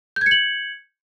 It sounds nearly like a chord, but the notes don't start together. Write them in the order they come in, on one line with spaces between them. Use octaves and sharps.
G6 G#6 C#7 F#7